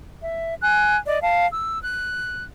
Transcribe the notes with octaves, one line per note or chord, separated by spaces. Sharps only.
E5
G#5 F#6
D5 D#5
F5 A5
E6
F#6